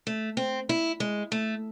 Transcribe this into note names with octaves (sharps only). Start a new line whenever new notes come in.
A3
C4
E4
G#3
A3